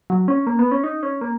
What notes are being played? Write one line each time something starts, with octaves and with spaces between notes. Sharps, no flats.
F#3
C#4
A#3
B3
C#4
D#4
C#4
A#3